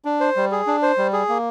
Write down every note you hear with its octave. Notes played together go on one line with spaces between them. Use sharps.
D4
C5
G3
G#4
D4
C5
G3
G#4
A#3